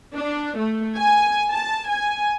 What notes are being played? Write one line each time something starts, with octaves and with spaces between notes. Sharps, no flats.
D4
A3
G#5
A5
G#5